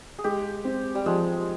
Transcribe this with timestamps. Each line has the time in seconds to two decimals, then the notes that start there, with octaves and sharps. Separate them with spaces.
0.19 G#4
0.24 G#3 G4
0.65 C4
0.95 G3
1.06 F3 G#3